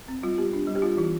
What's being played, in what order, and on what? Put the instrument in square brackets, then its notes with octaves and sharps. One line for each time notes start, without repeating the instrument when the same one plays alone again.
[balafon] C4
G3 F4
B3 G4
D4
G3
G4
B3 F4
E3 E4